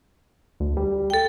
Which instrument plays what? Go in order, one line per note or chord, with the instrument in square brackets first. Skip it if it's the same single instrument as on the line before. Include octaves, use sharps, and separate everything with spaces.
[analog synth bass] D2
G3
[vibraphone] A4 G5